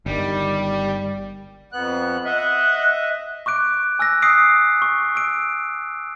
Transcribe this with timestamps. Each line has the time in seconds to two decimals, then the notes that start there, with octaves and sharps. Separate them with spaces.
0.06 G1 D#3 G3
1.73 F2 B3 F#6
2.25 D#5 E5 F#5
3.46 C#6 D6 F#6 D7
3.99 G#5 E6 F#6 A#6
4.22 D#6 F#6 B6 C7 D7
4.82 C#6
5.15 E6 D7